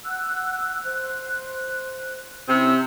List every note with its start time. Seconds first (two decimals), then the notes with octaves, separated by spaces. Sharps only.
0.05 F#5 E6 F#6
0.84 C5 F#6
2.49 C3 C#4 E4 C5 E6